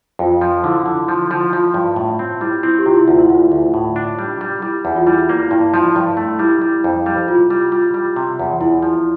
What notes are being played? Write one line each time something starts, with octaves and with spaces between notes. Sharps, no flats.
F2 F4
F3
D3 E4
D3
F3
F3
F3 F4
G2
A2
C4
G3 E4
C4 E4
G4
C3 F4
E4
D2 F4
E4
D2 F4
D2
A2
D4
G3
G3
G3 E4
E2
F4
G3 E4
A#3
G2 E4
F3
G2
A3
G3 E4
G3
F2
G3
C3 F4
G3
G3 F4
G3
C3
E2
E2 E4
F3